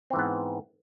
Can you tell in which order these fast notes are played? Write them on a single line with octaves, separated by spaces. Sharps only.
C4 E3 G#2 B3